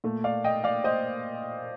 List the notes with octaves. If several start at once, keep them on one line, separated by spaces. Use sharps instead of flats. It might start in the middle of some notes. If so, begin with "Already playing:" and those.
A#2 A3
D5 F5
D#5 G5
D5 F5
C5 D#5